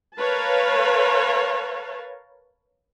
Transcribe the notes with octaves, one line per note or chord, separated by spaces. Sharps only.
A#4 B4 C#5 F5 A5